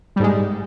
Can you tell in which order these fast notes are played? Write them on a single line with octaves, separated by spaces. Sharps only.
G3 G#2 G#3